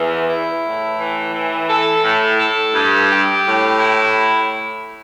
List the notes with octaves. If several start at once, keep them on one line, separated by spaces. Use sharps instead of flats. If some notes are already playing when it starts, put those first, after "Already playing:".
Already playing: E2
E4
A2
E3
E3
A4
A2
A4
G2
G4
A2
E4